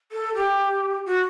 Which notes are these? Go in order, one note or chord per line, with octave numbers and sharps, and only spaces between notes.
A4
G4
F#4